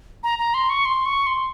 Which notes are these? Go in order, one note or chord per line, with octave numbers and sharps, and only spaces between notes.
A#5
A#5
C6
C#6
C6
C#6
C6